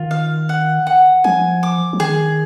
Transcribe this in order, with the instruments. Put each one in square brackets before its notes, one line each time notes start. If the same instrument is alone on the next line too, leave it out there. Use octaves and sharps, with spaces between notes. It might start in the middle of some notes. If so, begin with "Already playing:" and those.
Already playing: [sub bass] D#3 [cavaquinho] F4
[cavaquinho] F5
F#5
F#5
[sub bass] F3 [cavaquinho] G#5
[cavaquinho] D6
[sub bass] F3
[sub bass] D#3 [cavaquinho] G#4